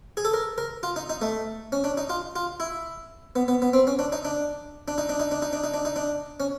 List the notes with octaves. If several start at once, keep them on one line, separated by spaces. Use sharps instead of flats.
G#4
A4
A#4
A#4
F4
D#4
D#4
A3
C#4
D4
D#4
F4
F4
E4
B3
B3
B3
C4
C#4
D4
D#4
D4
D4
D#4
D4
D#4
D4
D#4
D4
D#4
D4
D#4
D4
C#4